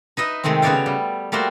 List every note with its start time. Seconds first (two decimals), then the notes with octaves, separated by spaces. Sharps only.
0.17 D#4 B4 D#5 E5
0.44 C3 D#3 G#3 A3 C4
0.62 C#3 B3 F#4 C#5 D5 F5
0.86 G3
1.32 G3 A3 A#3 F#4 C5